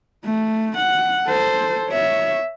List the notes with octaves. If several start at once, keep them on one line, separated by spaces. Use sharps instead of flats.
A3
F#5
A4 C5
C#5 E5